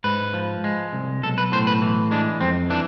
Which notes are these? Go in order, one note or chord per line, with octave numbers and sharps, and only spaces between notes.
G#2 B4
F3
G#3
C2
B1 A4
B4
A2 C5
B4
E3
G#3 D4
F2 C4
E3 D4